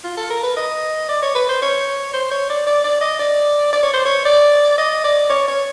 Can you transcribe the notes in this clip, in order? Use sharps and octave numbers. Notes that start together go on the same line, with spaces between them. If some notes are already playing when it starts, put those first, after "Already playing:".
F4
A4
A#4
B4
D#5
D5
C#5
B4
C5
C#5
C5
C#5
D5
D5
D5
D#5
D5
D5
C#5
C5
C#5
D5
D#5
D5
C#5
C#5